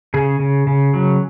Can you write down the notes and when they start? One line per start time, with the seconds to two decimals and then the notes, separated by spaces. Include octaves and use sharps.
0.14 C#3 G#4
0.40 C#3
0.67 C#3
0.94 F#3